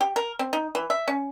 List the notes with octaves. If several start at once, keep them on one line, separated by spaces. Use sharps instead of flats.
G4
A#4
C4
D#4
E3
E5
C#4